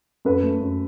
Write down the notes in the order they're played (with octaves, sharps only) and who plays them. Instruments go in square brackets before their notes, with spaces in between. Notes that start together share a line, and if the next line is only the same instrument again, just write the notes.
[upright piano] F#2 A4 B4
A3
F#2